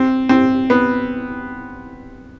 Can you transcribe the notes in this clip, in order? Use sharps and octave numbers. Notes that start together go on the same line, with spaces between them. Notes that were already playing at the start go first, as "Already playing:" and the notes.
Already playing: C4
C4
B3